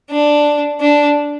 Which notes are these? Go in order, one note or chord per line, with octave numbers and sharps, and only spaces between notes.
D4
D4